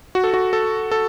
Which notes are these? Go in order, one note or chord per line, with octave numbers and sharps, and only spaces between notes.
F#4
A4
F#4
A4
A4